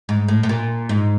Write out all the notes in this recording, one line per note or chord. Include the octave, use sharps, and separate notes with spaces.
G#2
A2
A2
A#2
G#2